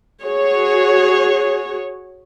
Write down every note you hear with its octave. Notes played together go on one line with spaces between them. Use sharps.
F#4 G#4 C#5